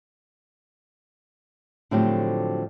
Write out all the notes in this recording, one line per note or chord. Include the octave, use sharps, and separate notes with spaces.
A2 D3 F3 F#3 C4 G4